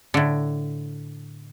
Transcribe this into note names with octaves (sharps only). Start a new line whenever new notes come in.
A2 D3